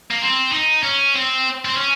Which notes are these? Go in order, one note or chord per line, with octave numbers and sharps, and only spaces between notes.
A#3
C4
D#4
C#4
C4
C4
C#4